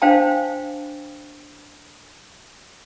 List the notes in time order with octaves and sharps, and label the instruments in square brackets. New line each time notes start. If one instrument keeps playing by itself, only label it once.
[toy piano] D4 C5 F5 G5 A5